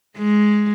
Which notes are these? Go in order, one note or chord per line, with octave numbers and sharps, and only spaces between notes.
G#3